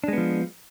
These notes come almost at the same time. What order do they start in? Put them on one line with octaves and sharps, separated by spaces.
D4 G#3 B3 F3